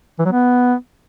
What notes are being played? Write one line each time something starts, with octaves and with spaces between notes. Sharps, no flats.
E3
F#3
B3